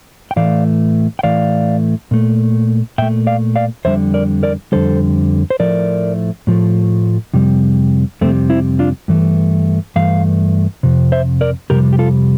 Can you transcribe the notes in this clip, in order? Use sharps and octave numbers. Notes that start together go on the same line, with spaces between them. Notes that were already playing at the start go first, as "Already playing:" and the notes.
G5
A2 E3 A3 D5 F5
G5
A2 E3 A3 D5 F5
A#2 A3
A#2 A3 E5 G5
D5 F5
D5 F5
F2 D3 G3 C5 E5
A#4 D5
A#4 D5
F2 D3 G3 A4 C5
C5
A2 F3 A3 A#4 D5
A2 F3 A3
F2 C3 G3
F2 C3 G3 A3 C4
C4 E4
D4 F4
G2 E3 A3
G2 E3 A3 F5
F2 C3
C5 E5
A#4 D5
F2 C3 G3 G4 A#4
G4
F4 A4